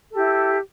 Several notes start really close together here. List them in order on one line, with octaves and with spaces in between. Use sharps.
A4 G4 E4